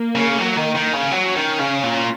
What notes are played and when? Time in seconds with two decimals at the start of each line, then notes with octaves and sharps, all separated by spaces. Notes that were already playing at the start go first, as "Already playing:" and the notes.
Already playing: A#3
0.16 C#3
0.39 F#3
0.57 D#3
0.75 D#3
0.93 C#3
1.11 F#3 C#4
1.36 D#3
1.59 C#3
1.83 A#2